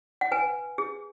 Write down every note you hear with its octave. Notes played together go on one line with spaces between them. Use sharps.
F#5
B4 G#5
G#4